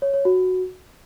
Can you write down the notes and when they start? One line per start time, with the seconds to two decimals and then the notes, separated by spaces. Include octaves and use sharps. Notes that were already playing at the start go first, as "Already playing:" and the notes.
0.02 C#5
0.14 C#5
0.25 F#4